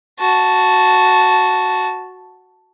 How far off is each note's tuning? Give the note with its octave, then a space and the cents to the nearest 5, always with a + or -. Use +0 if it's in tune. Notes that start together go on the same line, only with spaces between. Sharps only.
F#4 -5 A5 +0